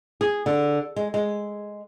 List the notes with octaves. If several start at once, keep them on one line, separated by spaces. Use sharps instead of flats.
G#4
D3
G#3
G#3